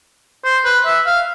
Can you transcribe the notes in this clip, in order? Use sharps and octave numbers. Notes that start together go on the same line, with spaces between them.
C5
B4
E5
F5